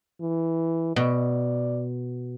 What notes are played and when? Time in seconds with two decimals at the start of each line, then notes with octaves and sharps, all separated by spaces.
0.21 E3
0.96 B2 D5